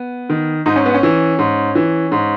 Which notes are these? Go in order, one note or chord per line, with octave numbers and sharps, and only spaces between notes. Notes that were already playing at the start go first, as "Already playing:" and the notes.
Already playing: B3
D#3
G#2 D#4
C#4
B3
C#4
E3
G#2
E3
G#2